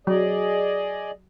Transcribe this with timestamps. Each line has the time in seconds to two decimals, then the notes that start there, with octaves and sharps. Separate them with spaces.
0.07 F#3 G#4 D5 D#5